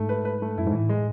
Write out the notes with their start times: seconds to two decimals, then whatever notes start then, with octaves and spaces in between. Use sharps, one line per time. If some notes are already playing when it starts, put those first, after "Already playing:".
Already playing: G#2 A3
0.09 B4
0.25 B4
0.42 A3
0.58 F#2 E4
0.66 G#2
0.73 A2 E3
0.89 G#3